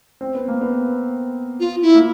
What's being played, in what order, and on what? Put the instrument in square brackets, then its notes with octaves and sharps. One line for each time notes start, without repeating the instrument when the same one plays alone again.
[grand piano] C4
B3
A#3
B3
[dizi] F4
E4
[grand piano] A#3